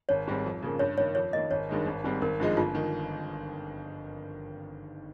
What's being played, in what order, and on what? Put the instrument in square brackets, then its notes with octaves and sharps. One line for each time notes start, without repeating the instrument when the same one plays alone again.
[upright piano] G#1 [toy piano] C#5
[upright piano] G#2 G3 C4
F2
C#3 F3 A#3 C#4
[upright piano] G2 [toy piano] C#5
[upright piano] D#3 A#3 [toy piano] C#5
[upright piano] F2 [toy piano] C#5
[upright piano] D#3 A#3 [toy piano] D#5
[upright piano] G#1 [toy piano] C#5
[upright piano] G2 D#3 G#3 D#4
G#1
G#2 G3 C4
[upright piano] G#1 [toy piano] A#4
[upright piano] G2 F3 G#3 D#4
[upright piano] G1 [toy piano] F4
[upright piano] D#3